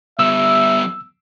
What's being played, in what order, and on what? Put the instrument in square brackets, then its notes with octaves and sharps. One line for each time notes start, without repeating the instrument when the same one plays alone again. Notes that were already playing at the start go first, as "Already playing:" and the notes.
[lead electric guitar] G3 B3 [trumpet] E5 [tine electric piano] E6